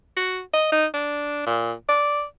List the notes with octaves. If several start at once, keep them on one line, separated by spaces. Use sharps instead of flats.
F#4
D#5
D#4
D4
A#2
D5